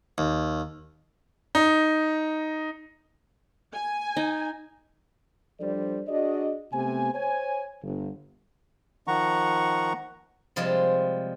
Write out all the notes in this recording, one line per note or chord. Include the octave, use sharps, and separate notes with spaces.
D#2
D#4
G#5
D#4
F3 G3 D4 A4 C5 D5
D4 F#4 G#4 D5 D#5
C3 A3 B3 G4 C5 G#5
C5 C#5 G#5
G1
D#3 F3 F#5 A#5 C#6
C3 F3 G3 G#3